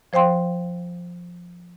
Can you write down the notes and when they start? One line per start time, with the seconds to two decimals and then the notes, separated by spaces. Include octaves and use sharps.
0.13 F3 C5 F5 G5 C6